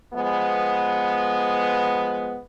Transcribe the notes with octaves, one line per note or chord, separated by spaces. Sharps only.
F3 G#3 B3